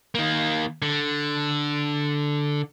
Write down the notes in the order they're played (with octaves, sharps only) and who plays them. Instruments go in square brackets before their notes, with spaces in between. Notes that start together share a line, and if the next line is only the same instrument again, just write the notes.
[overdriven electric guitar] D#3 A#3
D3